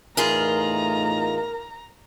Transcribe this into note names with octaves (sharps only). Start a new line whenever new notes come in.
E2 A2 A3 D#4 F4 G#4 A#4 A#5